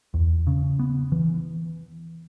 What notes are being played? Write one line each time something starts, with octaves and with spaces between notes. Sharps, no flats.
E2
C#3
B3
E3